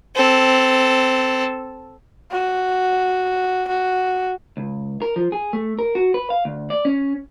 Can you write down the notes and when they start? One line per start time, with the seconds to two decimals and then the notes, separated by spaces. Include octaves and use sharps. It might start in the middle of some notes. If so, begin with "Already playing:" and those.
0.15 C4 A4
2.31 F#4
3.68 F#4
4.57 C#2
5.02 A#4
5.16 F3
5.32 G#4
5.53 A3
5.79 A#4
5.95 F#4
6.14 B4
6.30 F5
6.45 D2
6.70 D5
6.85 C#4